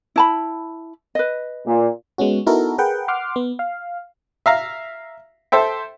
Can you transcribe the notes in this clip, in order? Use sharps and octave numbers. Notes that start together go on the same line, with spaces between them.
E4 A5 B5
B4 D#5
A#2
G#3 B3 C#4 F#4
B3 D#4 E4 F#4 A4 A#4
G#4 A#4 B4 F#5 G5
F#5 C6 D6 F6
B3
F5
E5 F5 A#5
A4 C5 E5 G5